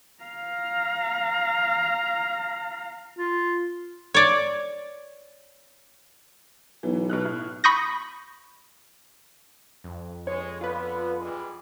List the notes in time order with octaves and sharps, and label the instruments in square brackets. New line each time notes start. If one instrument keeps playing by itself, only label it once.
[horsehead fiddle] F5 A#5
[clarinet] F4
[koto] C#5 D5
[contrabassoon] B1 [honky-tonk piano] E3
[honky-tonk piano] B2 F6 F#6
A2
[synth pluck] B5 C#6 D#6 G6 A#6
[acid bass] F2
[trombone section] G#3 [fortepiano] C#5
[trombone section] D3 B3 [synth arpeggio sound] F4 B4
[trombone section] E3 G3 G#3